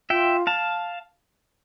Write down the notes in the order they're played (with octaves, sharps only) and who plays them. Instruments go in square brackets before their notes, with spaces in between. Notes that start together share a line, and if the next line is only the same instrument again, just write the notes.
[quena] F4 [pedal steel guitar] E5 G5
[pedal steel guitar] F5 A5